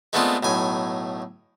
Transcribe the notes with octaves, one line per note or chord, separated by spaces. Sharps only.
G#3 A3 B3 C4 D4 F4
B1 A2 G#5